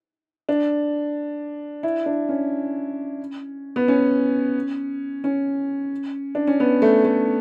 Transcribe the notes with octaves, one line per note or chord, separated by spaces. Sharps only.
D4
E4
D4
C#4
B3
C#4
C#4
D4
C#4
B3
A3
A3